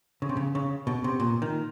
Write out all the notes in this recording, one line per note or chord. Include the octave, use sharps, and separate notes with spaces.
C#3
C3
C#3
C#3
B2
C3
A#2
D#3